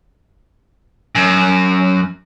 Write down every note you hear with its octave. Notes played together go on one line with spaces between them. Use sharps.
F#2